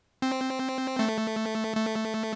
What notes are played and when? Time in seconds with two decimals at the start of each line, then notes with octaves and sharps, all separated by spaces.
0.22 C4
0.99 A3
1.77 A3